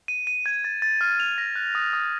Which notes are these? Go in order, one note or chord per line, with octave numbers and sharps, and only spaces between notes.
D#7
D#7
G#6
A6
A6
F6
F7
A#6
F#6
D#6
D#6